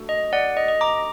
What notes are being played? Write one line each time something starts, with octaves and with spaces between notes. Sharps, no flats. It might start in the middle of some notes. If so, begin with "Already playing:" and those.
Already playing: A3 D4 F#4 A4
D#5
D5 F#5
D#5
D#5
A#5 D6